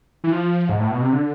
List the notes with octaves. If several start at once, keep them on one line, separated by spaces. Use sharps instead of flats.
E3
F3
G#2
A2
B2
C3
D3